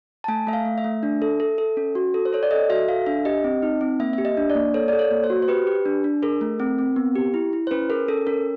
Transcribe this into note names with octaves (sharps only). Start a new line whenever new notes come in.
A5
A3 G#5
A3 E5
F5
A3
E5
A3
D4
A4
A4
A4
C#4
F#4
A4
C5
A4 C#5
D5
A4 D#5
F#4 E5
A4 F5
D4 E5
G4 D#5
C4
D#4
C4
A#3 E5
G4 E5
D#5
D4
D5
A#3
A4 C#5
A4 D5
C#5
A#3
C5
F#4
C5
G4 B4
G4
D4
D4
G#4 A#4
A3
C4
C4
B3
G4
E4
E4
C5
C#4 B4
G#4 A#4
C#4 A4
C#4 A#4